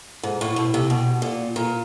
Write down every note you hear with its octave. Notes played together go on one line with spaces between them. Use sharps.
G#2
A2
B2
C3
B2
A#2
A#2